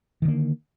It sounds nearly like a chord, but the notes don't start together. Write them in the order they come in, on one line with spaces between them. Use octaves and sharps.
D#3 D3 A#3